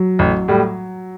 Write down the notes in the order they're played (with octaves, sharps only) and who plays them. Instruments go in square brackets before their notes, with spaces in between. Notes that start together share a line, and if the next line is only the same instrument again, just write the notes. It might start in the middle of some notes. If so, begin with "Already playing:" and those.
Already playing: [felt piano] F#3
[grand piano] A1
A2 G3